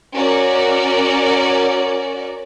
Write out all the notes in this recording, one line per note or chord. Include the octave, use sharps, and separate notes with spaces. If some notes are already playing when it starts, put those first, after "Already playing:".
C#4 F#4 A#4 D5